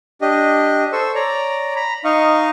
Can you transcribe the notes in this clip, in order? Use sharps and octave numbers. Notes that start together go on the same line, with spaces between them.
D4 G4 D#5
A4 C5 C#6 E6
C#5 D5 A#5
A#5 B5
D#4 D#5 F5 C#6